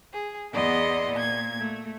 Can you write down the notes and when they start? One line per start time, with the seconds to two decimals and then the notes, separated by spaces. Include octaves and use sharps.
0.13 G#4
0.51 E2 B3 E4 D5 D#5 C6
1.11 A#2 G#6
1.58 A3